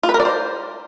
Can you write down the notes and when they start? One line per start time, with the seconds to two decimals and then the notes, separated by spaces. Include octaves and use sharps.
0.03 F4
0.09 B4
0.14 A#4
0.20 D5
0.25 C5